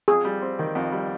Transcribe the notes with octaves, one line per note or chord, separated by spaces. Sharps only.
F2 G#4
G3
C4
D#3
F2
G3